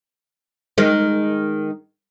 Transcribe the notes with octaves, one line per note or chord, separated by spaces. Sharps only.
D#3 G#3